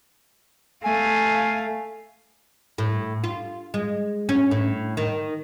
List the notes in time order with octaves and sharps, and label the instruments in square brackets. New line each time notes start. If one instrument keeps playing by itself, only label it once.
[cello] A3 F5 [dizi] G#5
[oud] A2
F4
G#3
C#4
A2
D#3